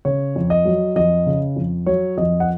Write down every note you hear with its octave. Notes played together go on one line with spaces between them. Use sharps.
C#3 C#5
F2
D#5
F#3
F2 D#5
C#3
F2
F#3 C#5
F2 D#5
F#5